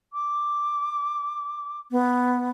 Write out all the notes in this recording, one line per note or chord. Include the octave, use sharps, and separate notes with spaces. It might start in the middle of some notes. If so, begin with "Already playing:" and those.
D6
B3